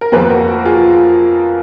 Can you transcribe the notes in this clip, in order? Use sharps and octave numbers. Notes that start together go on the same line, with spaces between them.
A#4
F2 F3 A#3 G#4 B4
F#4 A#4
F#4
F4 G#4